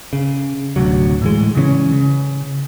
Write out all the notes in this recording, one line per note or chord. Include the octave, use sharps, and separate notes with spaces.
C#3
D1 D2 C3 F#3
A2 E3 G#3
C#3 E3 C4 C#4
C#3